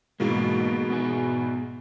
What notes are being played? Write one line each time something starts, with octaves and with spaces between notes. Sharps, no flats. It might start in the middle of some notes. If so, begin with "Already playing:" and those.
G#2 B2 E3 G#3 A#3
B3 G#4 G#5